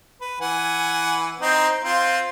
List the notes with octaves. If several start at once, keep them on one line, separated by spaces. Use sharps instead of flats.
B4
E3 F#5 G#5
C4 D#4
C4 F4